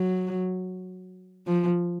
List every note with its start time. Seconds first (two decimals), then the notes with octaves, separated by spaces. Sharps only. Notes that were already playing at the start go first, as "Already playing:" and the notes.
Already playing: F#3
1.47 F3